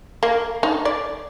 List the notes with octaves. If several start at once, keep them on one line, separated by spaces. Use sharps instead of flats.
A#3
D#4
D5